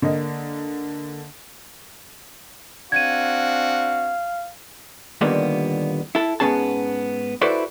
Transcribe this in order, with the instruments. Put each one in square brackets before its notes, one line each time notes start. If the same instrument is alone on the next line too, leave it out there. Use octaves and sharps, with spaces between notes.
[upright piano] D3 A#3 D#5
[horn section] C4 D4 F#4 [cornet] F5 [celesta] G#6 D#7
[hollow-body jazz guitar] D#2 A#2 D3 G3 A#3 B3
E4 A4
G#2 B3 C#4 G#4 A5
E4 F#4 A4 B4 C5 D5